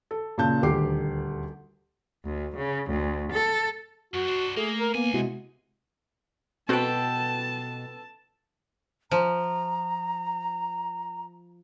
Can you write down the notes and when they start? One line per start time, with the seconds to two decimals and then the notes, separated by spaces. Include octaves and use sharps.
0.11 A4
0.38 A#2 C#3 A5 G6
0.62 D#1 D2 G4 D6 C7
2.25 D2
2.57 C#3
2.90 D2
3.32 A4
4.14 F#2 F#4
4.27 D4 C5
4.57 A3 A#3 G#4
4.80 A#4
4.95 C#2 A#3 B3 G#5
5.14 C3 G#3 E4 F#4
6.69 B2 C4 F#4 A4 B4 G5 A5
9.11 F3 A#5